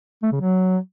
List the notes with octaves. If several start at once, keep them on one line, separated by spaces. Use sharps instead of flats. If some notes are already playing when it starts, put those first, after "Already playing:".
A3
C#3
F#3